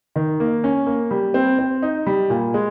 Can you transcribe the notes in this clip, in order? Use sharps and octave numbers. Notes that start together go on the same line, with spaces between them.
D#3
A#3
C#4
A#3
G3
C4
C4
D#4
G3
A#2
G#3